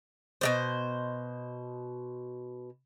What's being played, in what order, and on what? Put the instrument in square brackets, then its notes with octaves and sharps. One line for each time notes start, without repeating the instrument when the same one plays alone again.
[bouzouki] B2 G3 C5